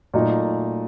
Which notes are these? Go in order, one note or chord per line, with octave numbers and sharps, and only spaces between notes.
A#2 F#3 A3 D#4